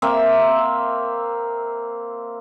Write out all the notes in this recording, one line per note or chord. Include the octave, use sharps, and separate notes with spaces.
A#3 C4 E5